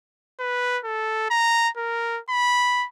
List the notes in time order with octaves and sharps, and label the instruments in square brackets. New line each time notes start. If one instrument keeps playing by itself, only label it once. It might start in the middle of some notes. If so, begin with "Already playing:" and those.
[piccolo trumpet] B4
A4
A#5
A#4
B5